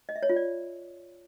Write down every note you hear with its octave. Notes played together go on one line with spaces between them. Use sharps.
D#5
E5
C#5
F4
D5